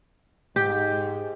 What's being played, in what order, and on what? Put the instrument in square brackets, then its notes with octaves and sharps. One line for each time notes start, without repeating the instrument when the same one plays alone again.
[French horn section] G#2 [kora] G4